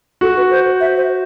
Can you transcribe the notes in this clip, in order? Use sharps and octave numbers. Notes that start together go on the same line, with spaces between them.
F#4 A4
B4
C5
E5
C5